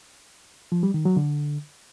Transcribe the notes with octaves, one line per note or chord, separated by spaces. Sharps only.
F3
G3
D#3
F#3
D3